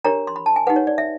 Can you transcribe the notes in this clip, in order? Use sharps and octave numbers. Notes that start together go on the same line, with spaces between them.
D4 G4 A#4 C#5 A#5
C6
B5
A5
G#5
D#4 G4 B4 F#5
C#5
D5
E5